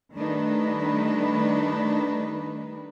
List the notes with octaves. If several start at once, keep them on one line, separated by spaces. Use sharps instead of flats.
D#3 G3 A3 D4 D#4 B4